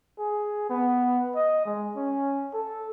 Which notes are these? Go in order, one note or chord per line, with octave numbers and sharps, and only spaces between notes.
G#4
B3
D#5
G#3
C#4
A4